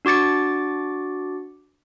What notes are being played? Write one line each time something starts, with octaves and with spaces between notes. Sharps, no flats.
D4 F#4 D6 A6 C#7